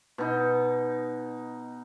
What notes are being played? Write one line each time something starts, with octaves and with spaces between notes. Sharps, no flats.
B2 D#4